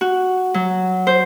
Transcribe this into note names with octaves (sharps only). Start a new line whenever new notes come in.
F#4
F#3
C5